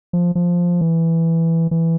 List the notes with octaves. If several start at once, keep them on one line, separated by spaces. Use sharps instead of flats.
F3
F3
E3
E3